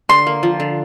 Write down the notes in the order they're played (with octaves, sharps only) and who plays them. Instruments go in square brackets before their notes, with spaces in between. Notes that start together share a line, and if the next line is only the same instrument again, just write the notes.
[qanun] D3 [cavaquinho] C6
[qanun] A#3
F3
D3